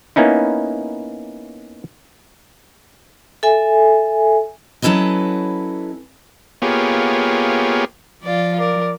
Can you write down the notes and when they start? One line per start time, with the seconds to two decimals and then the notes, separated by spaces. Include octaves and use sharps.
0.16 A#3 B3 C#4 D#4 E4
3.43 A4 E5 G#5
4.82 F#3 C#4 E4 A4 B4 D#5
6.62 A#3 B3 F4 G4 G#4 C#5
8.23 F3 F4 D5
8.60 A#4 D5